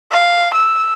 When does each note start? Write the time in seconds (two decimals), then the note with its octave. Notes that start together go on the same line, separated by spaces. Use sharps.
0.12 F5
0.54 E6